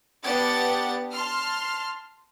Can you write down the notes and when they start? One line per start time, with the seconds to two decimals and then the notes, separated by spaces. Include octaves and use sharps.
0.24 B3 D4 G4 F#5 A6
1.12 A5 C6 F6